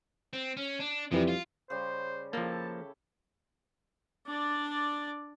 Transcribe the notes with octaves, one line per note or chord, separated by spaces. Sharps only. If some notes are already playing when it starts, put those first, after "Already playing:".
C4
C#4
D4
F2 C3 E3 G3
F4
C#3 G3 C5
F3 A#3 E4 G4 A4 A5
D4 D5